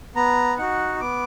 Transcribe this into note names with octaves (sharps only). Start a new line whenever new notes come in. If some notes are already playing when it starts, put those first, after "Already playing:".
B3 A#5
D#4 F#4 F#5
B3 D6